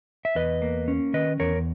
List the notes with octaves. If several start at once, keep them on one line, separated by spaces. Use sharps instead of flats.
E5
E2 B4 D#5
A#3
C#4
D#3 B4 D#5
E2 A#4 C#5